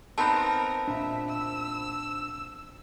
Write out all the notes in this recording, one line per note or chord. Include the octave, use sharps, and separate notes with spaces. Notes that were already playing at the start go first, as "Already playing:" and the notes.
B3 C4 D#4 A#4 A5 B5
A#2 D4 E5
E6